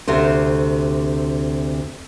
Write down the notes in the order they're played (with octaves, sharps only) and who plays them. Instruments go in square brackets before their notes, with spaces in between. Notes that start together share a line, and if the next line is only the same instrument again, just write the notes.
[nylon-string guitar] D2 C3 A3 C5